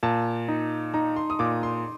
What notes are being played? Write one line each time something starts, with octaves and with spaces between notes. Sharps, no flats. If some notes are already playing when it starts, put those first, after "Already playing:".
A#2 A5
D#4
D#4 A#5
C6
D#6
A#2 D6
C6